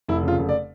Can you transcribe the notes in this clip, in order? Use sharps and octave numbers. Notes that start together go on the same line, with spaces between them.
F1 E4
C#3 F4
F1
D5